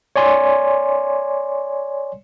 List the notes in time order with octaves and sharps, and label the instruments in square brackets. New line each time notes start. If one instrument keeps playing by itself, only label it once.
[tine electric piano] C#5 D5 G#5 C6